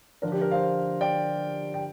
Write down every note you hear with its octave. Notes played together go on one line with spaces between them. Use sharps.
D3 F3 D4 A#4
G4
A#4
C5 F5
D5 G5
G5